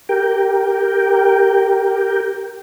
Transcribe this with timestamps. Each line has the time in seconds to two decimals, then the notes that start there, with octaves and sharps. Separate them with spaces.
0.09 G4 A#4 G5